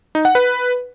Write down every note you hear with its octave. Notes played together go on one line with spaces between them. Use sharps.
D#4
F#5
B4